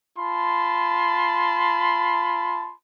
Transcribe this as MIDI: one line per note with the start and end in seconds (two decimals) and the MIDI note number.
0.18 2.73 65
0.18 2.73 81
0.18 2.73 83
0.18 2.73 84